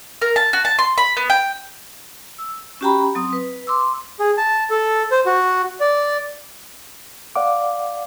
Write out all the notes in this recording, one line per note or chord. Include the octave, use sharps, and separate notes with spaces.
A#4
A5
F#4
A5
C6
B5
B3
G5
E6
C#4 F#4 G4 G5 A#5 B5
F#3 C4 D#6
B4
C6 D6 E6
G#4
A5
A4
C5
F#4
D5
D5 F5 F#5 D6